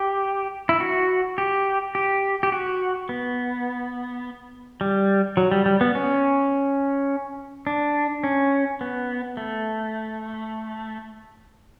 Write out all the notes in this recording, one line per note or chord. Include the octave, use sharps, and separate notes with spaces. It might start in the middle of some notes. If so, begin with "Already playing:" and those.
Already playing: G4
E4
F#4
G4
G4
G4
F#4
B3
G3
F#3
G3
G3
B3
C#4
D4
C#4
B3
A3